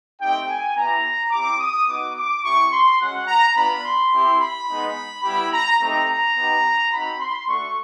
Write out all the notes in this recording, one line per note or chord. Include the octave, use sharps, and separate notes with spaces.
A3 C4 D#4 G4 G5
G#5
B3 E4 G4 A#5
C4 E4 G4 D6
D#6
B3 D#4 F#4 D6
D6
C4 E4 G4 C#6
C6
G#3 C#4 F#4 F#5
A#5
B3 D4 F4 B5
C6
C4 E4 G4
B5
G#3 B3 D#4
G3 B3 E4 G4 B5
A#5
A3 C4 D#4 G4 A#5
A#5
B3 D#4 G4
C4 D#4 F#4 B5
C6
A3 D4 F#4 C#6